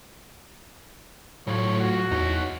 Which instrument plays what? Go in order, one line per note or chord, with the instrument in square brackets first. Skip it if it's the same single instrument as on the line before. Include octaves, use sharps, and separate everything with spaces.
[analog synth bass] A2 [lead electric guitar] F#3 F4 [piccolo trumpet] C#5
[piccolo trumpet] F#4
[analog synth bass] E2 [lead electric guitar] D#4 C#5